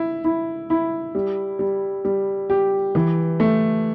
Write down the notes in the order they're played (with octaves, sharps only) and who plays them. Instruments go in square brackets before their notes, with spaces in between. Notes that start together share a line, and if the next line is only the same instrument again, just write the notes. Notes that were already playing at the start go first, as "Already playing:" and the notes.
Already playing: [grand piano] E4
E4
E4
G3
G3
G3
G4
E3
A3